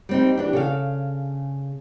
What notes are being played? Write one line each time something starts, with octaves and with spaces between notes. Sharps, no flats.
G3 C4 D#4
E3 D4 G4
C#3 A4 F5